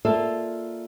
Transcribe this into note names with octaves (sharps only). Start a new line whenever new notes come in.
A#3 F4 A4 D5 E5